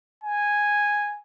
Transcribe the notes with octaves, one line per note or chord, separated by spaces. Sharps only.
G#5